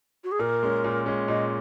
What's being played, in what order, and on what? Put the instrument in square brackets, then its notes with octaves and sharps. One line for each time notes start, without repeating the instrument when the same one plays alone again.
[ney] F#4
G#4
[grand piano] A#2 [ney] A#4
[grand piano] G#3 C#4
A#2
G#3 C#4
[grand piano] A#2 [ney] D#5